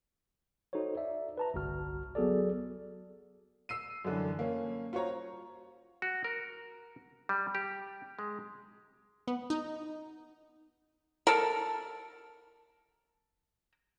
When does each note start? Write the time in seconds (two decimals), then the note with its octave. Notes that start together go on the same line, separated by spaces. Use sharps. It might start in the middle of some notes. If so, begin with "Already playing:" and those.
0.73 D#4 F#4 A4 C5 C#5
0.97 D5 E5
1.38 B4 A5 A#5
1.54 G1 C2 F#4 F6
2.15 F#3 B3 F#4 G#4 A4 D5
3.69 E6 C7 D#7
4.05 F#2 D3 E3
4.39 A#3 C#4
4.93 F4 F#4 C5 C#5 A#5
6.02 F#4
6.24 A#4
7.29 G3
7.55 G4
8.19 G#3
9.28 B3
9.50 D#4
11.27 A4 A#4